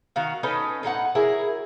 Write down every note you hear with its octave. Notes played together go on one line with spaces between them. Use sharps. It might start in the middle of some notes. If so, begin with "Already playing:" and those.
D#3 F#4 F5
C#4 D#4 A4 B4
A2 D#4 G4 F#5
F#3 E4 G#4 A#4